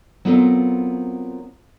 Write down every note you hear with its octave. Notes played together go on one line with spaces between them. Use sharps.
F#3 B3 C4 F4 A4 A#4